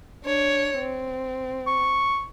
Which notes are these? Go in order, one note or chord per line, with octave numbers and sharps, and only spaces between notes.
D4 C#5
C4
C#6